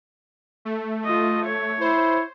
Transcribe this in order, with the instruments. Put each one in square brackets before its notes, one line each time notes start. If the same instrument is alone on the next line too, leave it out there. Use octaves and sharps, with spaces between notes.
[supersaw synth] A3
[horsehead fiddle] F4 D#5
C#5
[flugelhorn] E4 [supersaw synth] C5